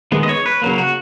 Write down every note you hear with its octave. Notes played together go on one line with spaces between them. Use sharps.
D#3 G#3 B3
D#5
C#5
B4
C#3 F#3 A#3
F#4